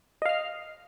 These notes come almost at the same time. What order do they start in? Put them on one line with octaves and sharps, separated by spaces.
D#5 F5 F6